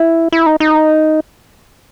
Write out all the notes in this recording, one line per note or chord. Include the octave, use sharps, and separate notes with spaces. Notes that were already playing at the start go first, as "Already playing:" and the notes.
Already playing: E4
E4
D#4
D#4